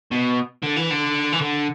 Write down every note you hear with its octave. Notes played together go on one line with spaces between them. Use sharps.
B2
D3
E3
D3
E3
D3